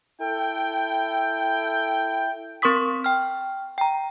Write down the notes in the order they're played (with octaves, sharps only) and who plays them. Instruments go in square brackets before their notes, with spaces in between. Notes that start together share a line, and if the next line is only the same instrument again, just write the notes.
[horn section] E4 A4 G5
[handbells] C4 A#4 C6 C#6 D#6 B6
G5 F6
G5 A#5